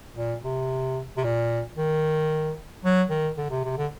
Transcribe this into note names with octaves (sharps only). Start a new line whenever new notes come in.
A#2
C3
C3
A#2
D#3
F#3
D#3
D3
C3
C3
D3